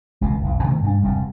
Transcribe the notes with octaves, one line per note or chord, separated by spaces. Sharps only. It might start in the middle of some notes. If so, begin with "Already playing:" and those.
E1 C#2 B2 E3
F1 B1
B2 D#3 A3 A#3
G2 B3 D4
E1 G2 C3 G3